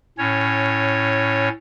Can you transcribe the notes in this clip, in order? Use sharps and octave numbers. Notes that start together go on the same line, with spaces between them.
A2 C#4 C#5